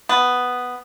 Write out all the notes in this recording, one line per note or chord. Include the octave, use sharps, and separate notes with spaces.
B3